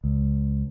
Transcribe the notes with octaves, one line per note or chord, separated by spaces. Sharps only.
C#2